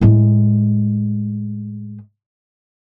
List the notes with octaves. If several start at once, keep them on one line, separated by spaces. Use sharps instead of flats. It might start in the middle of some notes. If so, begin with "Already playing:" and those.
A2 G#3